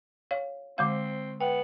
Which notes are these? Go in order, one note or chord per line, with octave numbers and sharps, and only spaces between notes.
C#5 F5
D3 G#3 C4 F5
B3 G5